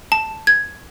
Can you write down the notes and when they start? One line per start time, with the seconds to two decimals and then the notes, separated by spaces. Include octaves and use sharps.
0.12 A5
0.47 G#6